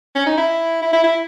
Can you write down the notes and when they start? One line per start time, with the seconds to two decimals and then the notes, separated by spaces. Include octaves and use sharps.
0.15 C#4
0.26 D#4
0.37 E4
0.82 E4
0.93 E4
1.04 E4